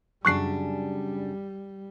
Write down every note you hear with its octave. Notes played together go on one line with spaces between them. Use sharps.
F#2 C#3 G3 D4 C#6 F#6 C7